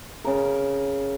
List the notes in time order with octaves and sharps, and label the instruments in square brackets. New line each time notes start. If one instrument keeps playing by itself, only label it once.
[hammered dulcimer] C#3 A#4